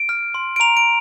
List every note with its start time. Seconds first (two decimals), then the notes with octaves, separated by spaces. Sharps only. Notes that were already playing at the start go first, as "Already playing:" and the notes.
Already playing: D7
0.09 F6
0.34 C6
0.56 D7
0.60 A#5 F7
0.77 D7